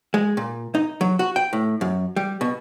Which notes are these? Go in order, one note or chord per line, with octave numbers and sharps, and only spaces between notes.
G#3
A#2
D#4
F#3
F#4
G5
A2
F#2
G3
B2